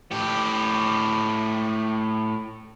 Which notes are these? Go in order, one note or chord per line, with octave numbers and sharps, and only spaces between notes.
A2 G4